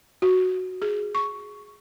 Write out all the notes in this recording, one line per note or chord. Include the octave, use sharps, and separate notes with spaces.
F#4
G#4
C#6